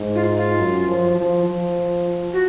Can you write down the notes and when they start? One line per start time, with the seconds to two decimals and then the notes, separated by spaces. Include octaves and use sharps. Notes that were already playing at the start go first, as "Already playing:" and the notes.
Already playing: G#2
0.15 F4
0.37 F4
0.59 F#2
0.87 F3
1.17 F3
1.45 F3
2.33 F#4